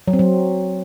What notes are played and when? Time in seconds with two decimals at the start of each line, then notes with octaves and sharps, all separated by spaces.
0.08 F#3
0.13 C4
0.19 F#3